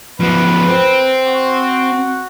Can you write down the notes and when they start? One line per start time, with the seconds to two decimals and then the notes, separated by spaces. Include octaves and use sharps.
0.20 F3 B3 B4
0.68 C4
1.27 F#4